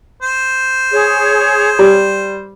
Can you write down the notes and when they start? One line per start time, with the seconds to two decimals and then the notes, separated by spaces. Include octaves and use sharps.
0.23 C5
0.92 G#4 C#5
1.79 G3